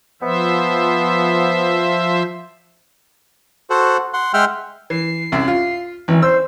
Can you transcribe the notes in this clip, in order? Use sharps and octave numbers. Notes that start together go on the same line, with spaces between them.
F3 B3 C5 E5
F#4 A4 C5 F#5
F#5 C6
G#3 E5 F#5 G5 C6 F6
E3 C7
C2 F#2 E5
F4
G#1 E3
C5 E6